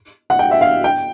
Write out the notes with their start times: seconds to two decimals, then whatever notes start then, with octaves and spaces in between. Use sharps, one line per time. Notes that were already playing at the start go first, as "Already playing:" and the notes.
0.30 F#5
0.39 G5
0.51 E5
0.61 F5
0.84 G5